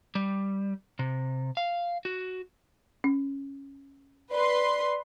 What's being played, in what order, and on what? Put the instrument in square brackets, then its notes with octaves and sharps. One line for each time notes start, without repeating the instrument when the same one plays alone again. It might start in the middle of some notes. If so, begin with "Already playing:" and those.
[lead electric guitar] G3
C3
F5
F#4
[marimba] C#4
[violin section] B4 C6 [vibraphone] D5 B5